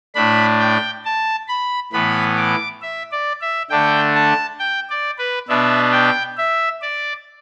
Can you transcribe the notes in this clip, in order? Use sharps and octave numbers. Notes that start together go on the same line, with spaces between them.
A2 A3 D4 B5
G5
A5
B5
A2 E3 B3 B5
D6
E5
D5
E5
D3 A3 D4 G5
A5
G5
D5
B4
B2 B3 D4 E5
G5
E5
D5